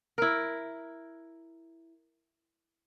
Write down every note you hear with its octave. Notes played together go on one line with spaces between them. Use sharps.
E4 A#4